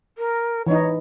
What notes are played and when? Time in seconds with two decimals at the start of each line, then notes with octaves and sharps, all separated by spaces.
0.18 A#4
0.67 E3 D#4 C#5